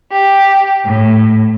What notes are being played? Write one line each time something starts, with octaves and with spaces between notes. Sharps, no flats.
G4
A2